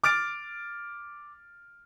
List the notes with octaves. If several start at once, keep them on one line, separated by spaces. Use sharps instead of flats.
D6 F6 A6 D7